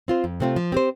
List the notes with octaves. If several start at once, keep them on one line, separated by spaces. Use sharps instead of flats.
C4 F4 C5
F2
C3 A3 C4 F4
F3
C4 G4 C5